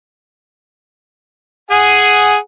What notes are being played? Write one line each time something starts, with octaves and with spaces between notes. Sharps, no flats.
G#4 F#5 G#5